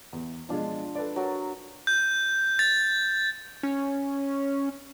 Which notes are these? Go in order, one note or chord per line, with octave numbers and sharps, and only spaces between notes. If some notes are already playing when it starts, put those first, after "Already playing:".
E2
B2 F3 G#3 D4 F4
A4 B4 D5
F#3 F#4 A#4
G6
A6
C#4